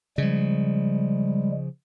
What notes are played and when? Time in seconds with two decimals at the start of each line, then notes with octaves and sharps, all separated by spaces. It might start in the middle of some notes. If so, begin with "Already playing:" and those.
0.18 C#3 F3 G3 G#3